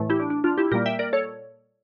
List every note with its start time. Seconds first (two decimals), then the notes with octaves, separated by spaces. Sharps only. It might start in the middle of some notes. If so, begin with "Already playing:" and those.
Already playing: A2 E3 A3
0.10 E4 G4
0.20 D4
0.30 D4
0.44 D4 F4
0.58 E4 G4
0.72 A#2 G3 A#3 G4 A#4
0.86 E5 G5
0.99 A#4 D5
1.13 A4 C#5